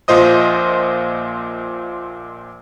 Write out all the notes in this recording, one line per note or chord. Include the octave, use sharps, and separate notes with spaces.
A#1 A#2 F4 C5 D#5 D#6